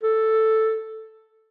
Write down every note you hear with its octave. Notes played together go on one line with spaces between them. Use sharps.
A4